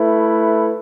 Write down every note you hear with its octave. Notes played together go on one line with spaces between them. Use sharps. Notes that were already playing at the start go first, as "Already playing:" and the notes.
Already playing: A3 E4 B4